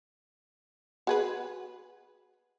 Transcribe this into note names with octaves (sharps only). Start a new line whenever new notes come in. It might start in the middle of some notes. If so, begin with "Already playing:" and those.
F#4 G#4 B4